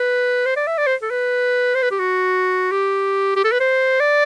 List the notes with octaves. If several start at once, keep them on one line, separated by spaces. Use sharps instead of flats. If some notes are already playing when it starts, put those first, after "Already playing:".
Already playing: B4
C5
D5
E5
D5
C5
A4
B4
C5
B4
G4
F#4
G4
G4
A4
B4
C5
D5